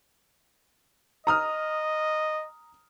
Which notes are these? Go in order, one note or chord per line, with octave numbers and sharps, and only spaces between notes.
D#5 A#5 D#6 F6